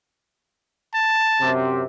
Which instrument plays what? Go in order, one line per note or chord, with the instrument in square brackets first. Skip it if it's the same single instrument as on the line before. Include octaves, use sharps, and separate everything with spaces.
[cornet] A5
[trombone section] F#2 C3